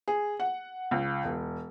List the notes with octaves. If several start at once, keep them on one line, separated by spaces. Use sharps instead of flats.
G#4
F#5
C#2
E1